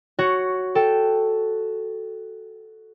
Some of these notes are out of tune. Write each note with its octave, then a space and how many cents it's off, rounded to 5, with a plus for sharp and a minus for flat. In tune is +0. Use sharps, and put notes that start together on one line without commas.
F#4 +5 C#5 +0
A4 +0 G5 +0